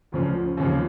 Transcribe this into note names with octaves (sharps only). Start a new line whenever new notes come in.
D2 C#3 F3
D#2 C#3 F3